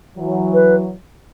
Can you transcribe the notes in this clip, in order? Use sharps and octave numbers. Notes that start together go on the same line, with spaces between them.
E3 F#3
B4